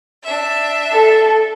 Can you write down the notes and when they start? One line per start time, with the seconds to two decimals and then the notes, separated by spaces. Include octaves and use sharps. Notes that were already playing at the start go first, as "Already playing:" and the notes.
0.23 D4 E5
0.92 A4